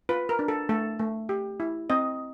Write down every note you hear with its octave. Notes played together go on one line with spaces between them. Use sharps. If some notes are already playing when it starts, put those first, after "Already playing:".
F4 B4
A#4
D4
A4
A3 A4
A3
G4
E4
C4 D#5